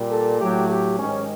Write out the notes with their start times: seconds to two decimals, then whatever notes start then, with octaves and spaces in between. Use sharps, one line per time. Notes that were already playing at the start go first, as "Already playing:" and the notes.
Already playing: A#2 G3
0.08 A4
0.38 A2 F#3 A3 G4
0.68 G4
0.97 G#2 D#3 G#3 C#4